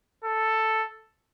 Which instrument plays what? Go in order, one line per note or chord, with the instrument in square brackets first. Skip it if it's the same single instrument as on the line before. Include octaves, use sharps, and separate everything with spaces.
[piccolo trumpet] A4